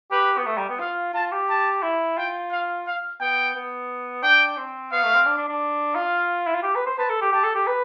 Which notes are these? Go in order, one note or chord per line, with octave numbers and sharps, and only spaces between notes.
G4 B4
B3
A3
G3
B3
F4 F5
F4 A5
G4
A5
E4
F4 G5
F5
F5
B3 G5
B3
D4 G5
C4
B3 F5
A3
C4
D4
D4
D4
F4 F5
E4
F4
G4
B4
C5
B4 A5
A4
G4
G4 A5
A4
G4
B4